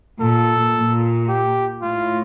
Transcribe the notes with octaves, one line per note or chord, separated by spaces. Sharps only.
A#2 A4
A#2
G4
A2 F4